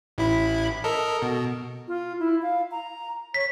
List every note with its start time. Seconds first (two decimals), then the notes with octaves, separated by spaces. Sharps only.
0.18 A1 E4 B5
0.84 A4 A#4 D#5
1.22 B2
1.88 F4
2.20 E4
2.42 F5
2.71 A#5
3.34 C#5 B6